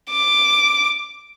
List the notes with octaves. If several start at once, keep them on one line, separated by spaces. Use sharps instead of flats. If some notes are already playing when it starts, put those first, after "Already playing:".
D6